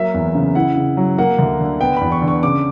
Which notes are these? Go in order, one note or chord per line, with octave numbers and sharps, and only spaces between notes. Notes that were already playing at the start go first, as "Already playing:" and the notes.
Already playing: F#3 A#3 E5
E2
C#3
E4 F#5
C#3
F#3
A#3 F#5
D2
D3
B3 G5
E2 B5
C#6
D3
C#6
C#3 D6